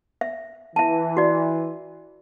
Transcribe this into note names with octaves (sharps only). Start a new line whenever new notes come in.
E5
E3 E5 A5
F#4 D5